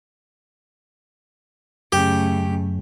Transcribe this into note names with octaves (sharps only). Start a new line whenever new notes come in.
F#2 C#3 A3 G4